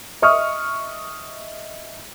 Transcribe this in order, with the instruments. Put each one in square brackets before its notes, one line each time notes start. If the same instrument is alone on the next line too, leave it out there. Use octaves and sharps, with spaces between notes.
[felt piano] D#5 E5 C#6 D#6 F6